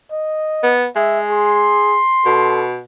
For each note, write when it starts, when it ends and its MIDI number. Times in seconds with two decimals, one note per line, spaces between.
0.11 0.74 75
0.63 0.86 59
0.96 1.75 56
0.96 1.20 76
1.30 2.01 68
1.30 2.68 84
2.26 2.80 47
2.26 2.66 69